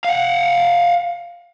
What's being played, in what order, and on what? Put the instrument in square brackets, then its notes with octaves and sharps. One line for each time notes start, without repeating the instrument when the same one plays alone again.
[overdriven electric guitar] F5 F#5